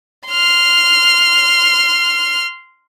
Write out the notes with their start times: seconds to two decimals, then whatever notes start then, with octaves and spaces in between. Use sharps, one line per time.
0.28 C6 F6